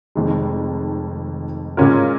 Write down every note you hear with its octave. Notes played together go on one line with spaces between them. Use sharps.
F1 F2 D#3 G#3
A#2 G#3 C#4 F4 A#4